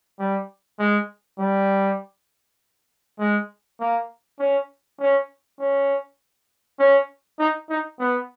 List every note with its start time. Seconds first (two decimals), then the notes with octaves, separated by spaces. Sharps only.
0.19 G3
0.79 G#3
1.39 G3
3.19 G#3
3.80 A#3
4.39 C#4
5.00 C#4
5.60 C#4
6.80 C#4
7.40 D#4
7.70 D#4
8.00 B3